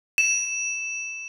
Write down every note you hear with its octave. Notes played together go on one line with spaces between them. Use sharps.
E7